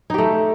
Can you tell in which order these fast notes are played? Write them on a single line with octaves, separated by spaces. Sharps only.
D#4 G4 A3